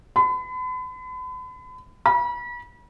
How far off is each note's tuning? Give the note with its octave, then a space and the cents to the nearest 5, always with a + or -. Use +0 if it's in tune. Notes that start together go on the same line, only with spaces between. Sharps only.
B5 +40
B5 -35